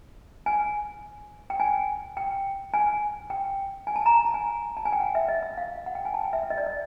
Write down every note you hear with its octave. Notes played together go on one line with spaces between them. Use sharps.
G#5
G5
G#5
G5
G#5
G5
G#5
A5
A#5
A5
G#5
A5
G#5
G5
F#5
E5
D#5
E5
F5
F#5
G5
G#5
A5
G5
E5
E5
D#5
D5
D#5